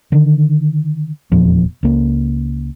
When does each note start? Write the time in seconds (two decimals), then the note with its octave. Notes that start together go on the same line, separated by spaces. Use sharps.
0.12 D3 D#3
1.32 F1 E2 A#2 F3
1.83 C#2 A#3